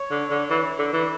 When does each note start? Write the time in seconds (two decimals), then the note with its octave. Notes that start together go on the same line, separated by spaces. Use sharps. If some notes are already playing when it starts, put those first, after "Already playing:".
Already playing: C#5
0.11 D3
0.30 D3
0.50 E3
0.79 D3
0.93 E3